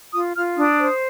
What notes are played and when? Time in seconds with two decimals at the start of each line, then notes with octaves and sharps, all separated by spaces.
0.13 F4 D#6
0.34 F4 F6
0.57 D4 D#6
0.79 C5